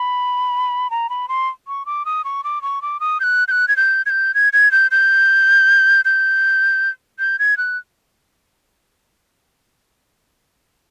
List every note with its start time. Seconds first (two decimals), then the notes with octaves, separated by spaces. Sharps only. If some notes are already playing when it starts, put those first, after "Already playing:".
Already playing: B5
0.91 A#5
1.10 B5
1.29 C6
1.68 C#6
1.86 D6
2.06 D#6
2.25 C#6
2.44 D6
2.62 C#6
2.82 D6
3.00 D#6
3.20 G6
3.24 F#6
3.48 G6
3.51 F#6
3.68 G#6
3.77 G6
4.06 G#6
4.10 G6
4.34 G#6
4.53 G#6
4.72 G6
4.91 G6
6.05 G6
7.19 G6
7.39 G#6
7.58 F#6